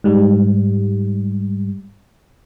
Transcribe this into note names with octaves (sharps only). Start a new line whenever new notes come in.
G#2 G3